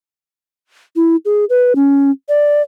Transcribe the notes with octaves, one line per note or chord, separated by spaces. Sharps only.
E4
G#4
B4
C#4
D5